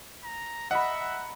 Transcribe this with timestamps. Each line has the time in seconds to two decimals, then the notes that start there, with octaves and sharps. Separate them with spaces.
0.24 A#5
0.71 D#5 E5 F#5 A#5 B5